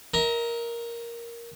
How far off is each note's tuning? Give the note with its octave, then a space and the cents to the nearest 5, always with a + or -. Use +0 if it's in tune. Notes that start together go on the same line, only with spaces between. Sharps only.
A#4 +5 E5 -45